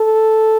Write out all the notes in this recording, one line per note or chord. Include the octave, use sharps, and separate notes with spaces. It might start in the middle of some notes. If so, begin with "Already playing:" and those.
Already playing: A4